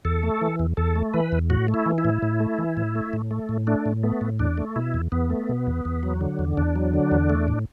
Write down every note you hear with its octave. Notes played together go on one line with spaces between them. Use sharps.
E2 A4
A3
E3
E2
E2 A4
A3
E3 B4
E2
A2 F#4
A3
E4
E3
E4
A2
A2
A3
E3
A2
A3
A2
A3
A2
A3 D4
A2
A3 B3
A2
E2 D4
A3
B2 E4
E2
E2 B3
A3
B2
E2
E2
F#3
D3
E2
E2 D4
F#3
D3
E2
A3
A2